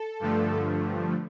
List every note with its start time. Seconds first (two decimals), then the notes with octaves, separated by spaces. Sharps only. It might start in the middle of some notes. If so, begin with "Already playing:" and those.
Already playing: A4
0.20 G2 D3 F3 A3